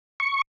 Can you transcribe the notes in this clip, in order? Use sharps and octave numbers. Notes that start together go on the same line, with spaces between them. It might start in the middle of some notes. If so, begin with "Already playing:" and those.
C#6